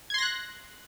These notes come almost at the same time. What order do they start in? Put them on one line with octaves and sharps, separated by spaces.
G#6 C6 A#6 F#6